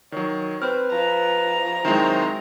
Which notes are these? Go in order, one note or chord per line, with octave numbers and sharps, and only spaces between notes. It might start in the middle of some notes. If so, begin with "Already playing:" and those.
D#3 F#3 C#5
C4 B4 F6
F3 A#5
D#3 F#3 G#3 C4 E4